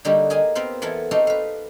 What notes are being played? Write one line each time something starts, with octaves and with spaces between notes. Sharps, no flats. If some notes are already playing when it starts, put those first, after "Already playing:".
D3 G3 A#3 D#4 F#4 G4
G4 G#4 A#4 D#5 G#5
B3 C4 A#4 C5 F5
E2 E3 B3 A4 A#4 F#5
C4 D#4 F#4 G4 A4 F5
B4 F5